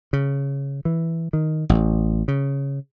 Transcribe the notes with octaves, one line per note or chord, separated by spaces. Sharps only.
C#3
E3
D#3
A1
C#3